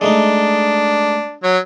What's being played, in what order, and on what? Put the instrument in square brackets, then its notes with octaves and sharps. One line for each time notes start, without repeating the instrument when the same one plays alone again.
[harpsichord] G#3 A3 D#4 [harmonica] D4
[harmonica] F#3 C#5